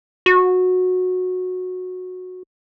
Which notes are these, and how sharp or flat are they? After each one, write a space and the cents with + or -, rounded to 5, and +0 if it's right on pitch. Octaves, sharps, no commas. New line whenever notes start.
F#4 -15